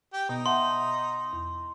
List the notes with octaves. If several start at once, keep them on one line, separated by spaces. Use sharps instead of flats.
G4
B2 B3 D#4
E5 F#5 A5 C6
E2